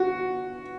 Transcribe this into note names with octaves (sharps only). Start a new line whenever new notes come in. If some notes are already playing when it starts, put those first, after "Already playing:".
Already playing: F#4